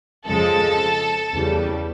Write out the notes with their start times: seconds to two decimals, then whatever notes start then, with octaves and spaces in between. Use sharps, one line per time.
0.25 F2 C#3 F3 G#3 A4
1.32 E2 C#3 E3 G3